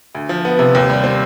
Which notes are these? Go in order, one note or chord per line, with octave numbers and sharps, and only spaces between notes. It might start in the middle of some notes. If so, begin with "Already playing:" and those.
D2
F3
B3
C3
D#2
G3
C4